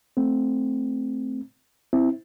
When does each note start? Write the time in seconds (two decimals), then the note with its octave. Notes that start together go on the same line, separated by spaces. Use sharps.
0.17 A3 C4
1.93 C4 E4